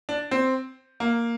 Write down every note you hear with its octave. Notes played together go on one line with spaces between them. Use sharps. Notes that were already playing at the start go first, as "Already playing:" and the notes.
D4
C4
A#3